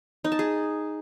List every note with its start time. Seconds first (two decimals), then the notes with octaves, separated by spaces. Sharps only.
0.24 D#4
0.32 A5
0.39 G#4